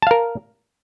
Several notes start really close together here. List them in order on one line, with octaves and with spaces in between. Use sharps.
A5 F5 A#4